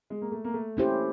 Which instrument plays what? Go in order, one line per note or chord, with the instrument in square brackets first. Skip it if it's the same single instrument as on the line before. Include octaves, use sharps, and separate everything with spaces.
[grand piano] G#3
A#3
A3
A#3
A3
[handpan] A#3 C#4 E4 G4 C5